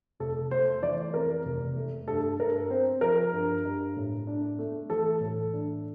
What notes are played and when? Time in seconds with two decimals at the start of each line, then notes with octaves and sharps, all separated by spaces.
0.20 F1 A4
0.51 A3 C5
0.82 E3 D5
1.14 F2 A#4
1.45 F1
1.76 A3
2.08 G2 A4
2.39 G2 A#4
2.70 C4 C5
3.01 F3 A#4
3.33 G2
3.65 G2
3.97 A2
4.27 D4
4.59 A3
4.90 E3 A4
5.21 A2
5.53 D4